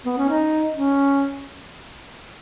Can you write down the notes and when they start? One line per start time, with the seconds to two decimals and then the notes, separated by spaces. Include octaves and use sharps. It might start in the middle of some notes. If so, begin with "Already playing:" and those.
0.05 B3
0.18 C#4
0.29 D#4
0.75 C#4